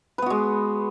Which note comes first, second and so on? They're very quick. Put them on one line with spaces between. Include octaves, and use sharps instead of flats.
B4 B3 F#4 G#3